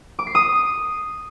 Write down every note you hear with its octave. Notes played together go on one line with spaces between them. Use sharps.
D6
C7
D#6